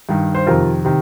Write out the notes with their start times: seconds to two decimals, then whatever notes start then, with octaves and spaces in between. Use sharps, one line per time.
0.09 G2 D#3
0.35 C5
0.46 F2 C3 D#3 F4 A#4
0.85 C3 D#3